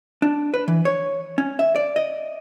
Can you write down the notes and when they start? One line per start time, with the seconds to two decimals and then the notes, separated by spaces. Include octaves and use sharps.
0.22 D4
0.54 B4
0.68 E3
0.85 C#5
1.38 C#4
1.59 E5
1.76 D5
1.96 D#5